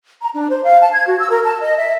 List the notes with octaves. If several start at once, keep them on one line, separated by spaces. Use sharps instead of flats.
A#5
D4
C5
F5
A5
G#6
F#4
E6
A#4
A5
D#5
E5